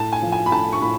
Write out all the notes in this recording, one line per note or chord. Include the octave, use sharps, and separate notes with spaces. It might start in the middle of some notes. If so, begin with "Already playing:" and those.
Already playing: A2 A5
G#5
F3
G#5
B5
A2 A5
C#6
A2 B5